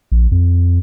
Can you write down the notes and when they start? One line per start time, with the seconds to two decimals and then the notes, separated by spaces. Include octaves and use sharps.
0.12 A#1
0.32 F2